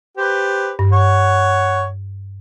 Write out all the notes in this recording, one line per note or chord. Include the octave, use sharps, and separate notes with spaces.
G4 B4 C5
G2
C#5 F#5